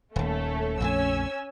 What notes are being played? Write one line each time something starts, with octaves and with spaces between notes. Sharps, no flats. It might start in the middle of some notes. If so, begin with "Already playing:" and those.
D#1 D#2 A3 C#4 A4
A#1 F2 A3 C#4 G#5 E6